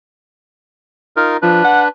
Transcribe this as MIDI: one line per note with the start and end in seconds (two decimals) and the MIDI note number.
1.17 1.37 63
1.17 1.37 65
1.17 1.37 70
1.42 1.60 53
1.42 1.88 62
1.42 1.88 71
1.64 1.82 78